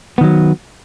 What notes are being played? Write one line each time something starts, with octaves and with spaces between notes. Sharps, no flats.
D#3 F#3 B3